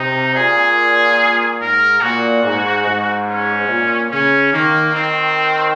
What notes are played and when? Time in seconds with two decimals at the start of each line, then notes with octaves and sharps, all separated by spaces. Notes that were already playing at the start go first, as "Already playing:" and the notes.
Already playing: C3 D#4
0.35 A#2 G#4
1.60 G#2 A#4
2.02 A#2 F#4
2.44 G#2
2.86 G#2
3.28 C#4
3.69 A#2
4.11 C#3 C#4
4.53 D#3 A#3
4.95 D#3 C4